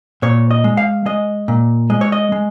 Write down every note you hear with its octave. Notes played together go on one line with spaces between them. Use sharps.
A#2 C#5
D#5
G#3
F5
G#3 D#5
A#2
G#3 D#5
C#5
D#5
G#3